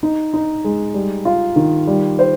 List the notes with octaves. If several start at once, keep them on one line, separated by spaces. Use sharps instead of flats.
D#4
D#4
G#3
G3
F4
D#3
G3
C5